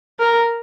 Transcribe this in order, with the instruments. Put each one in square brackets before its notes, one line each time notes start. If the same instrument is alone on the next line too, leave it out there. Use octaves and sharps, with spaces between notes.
[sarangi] A#4